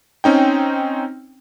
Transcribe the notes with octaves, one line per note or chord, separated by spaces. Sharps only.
C4 C#4 D#4 G5